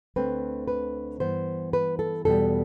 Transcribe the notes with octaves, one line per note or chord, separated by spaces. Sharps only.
D2 D3 A3 C4 B4
B4
G2 E3 B3 C5
B4
A4
E2 B2 G3 A4